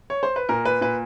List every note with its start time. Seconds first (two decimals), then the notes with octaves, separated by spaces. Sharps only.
0.10 C#5
0.23 C5
0.36 B4
0.49 A#2 A#4
0.65 B4
0.81 A#2 B4